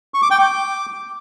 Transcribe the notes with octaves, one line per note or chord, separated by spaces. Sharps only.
C#6
D6
G5
D6